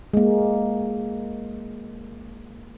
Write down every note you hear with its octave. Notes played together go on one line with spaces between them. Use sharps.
G#3 A#3